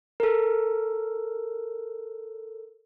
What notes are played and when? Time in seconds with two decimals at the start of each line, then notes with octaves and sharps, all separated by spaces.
0.20 A4 A#4